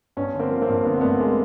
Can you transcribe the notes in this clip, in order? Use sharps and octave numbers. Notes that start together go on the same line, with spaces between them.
G2 B3 C#4
D3
A#3 C4
F3
A#3 C4
G2
D3 B3
C4
G2 A3 B3
G#3 A#3